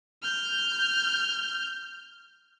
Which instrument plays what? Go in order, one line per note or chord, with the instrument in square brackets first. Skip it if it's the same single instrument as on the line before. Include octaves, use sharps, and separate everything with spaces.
[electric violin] F6 G6